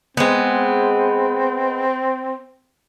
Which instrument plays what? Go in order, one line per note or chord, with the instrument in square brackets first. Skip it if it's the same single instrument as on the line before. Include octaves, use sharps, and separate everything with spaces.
[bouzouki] G#3 B3 [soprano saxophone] C4